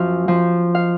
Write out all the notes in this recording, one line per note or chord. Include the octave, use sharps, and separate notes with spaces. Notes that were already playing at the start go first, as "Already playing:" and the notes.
Already playing: F#2 F3 F5
F3
F5